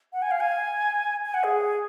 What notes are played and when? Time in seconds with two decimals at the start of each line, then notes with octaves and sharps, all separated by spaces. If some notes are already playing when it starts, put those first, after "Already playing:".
0.13 F#5
0.22 G#5
0.31 F5
0.40 G#5
1.25 G#5
1.34 F#5
1.44 G#4